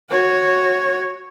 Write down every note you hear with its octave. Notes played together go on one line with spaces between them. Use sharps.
F#4 C#5